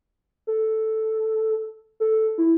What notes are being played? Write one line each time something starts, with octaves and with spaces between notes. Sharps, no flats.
A4
A4
E4